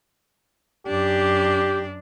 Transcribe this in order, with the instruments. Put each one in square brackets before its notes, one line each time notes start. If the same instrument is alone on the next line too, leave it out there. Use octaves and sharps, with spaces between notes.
[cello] F#2 D4 [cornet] G4